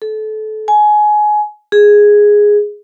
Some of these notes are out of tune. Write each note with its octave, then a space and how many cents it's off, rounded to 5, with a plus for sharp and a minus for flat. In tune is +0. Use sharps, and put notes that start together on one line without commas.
A4 -25
G#5 +20
G#4 -5